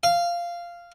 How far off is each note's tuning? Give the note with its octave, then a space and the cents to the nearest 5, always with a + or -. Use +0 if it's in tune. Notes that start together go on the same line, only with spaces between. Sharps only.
F5 -10